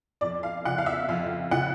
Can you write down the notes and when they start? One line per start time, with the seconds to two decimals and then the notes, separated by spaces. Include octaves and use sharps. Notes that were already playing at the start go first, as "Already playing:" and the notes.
0.21 F2 D5
0.43 F5
0.65 C#3 F3 F#5
0.78 F5
0.86 E5
1.08 F2 F5
1.51 C#3 F3 F#5